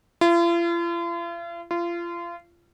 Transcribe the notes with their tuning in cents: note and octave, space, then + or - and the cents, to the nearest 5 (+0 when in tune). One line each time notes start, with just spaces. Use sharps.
F4 -45
F4 -30